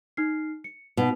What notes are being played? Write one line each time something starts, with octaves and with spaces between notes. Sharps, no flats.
D#4 F6 C7
C#7
B2 D#4 F7